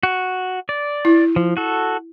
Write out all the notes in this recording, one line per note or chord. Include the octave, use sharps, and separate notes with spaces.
F#4
D5
E4
F3
F#4 A4